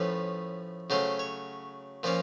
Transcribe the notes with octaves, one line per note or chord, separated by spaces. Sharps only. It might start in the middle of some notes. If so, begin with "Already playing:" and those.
Already playing: A2 F3 A3 C#4 B4
C#3 F#3 A3 C#4 C5
C#5
A#2 F3 A#3 C#4